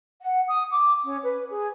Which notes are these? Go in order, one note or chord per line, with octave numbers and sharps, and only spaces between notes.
F#5
D#6
D6
C#4
B4
G#4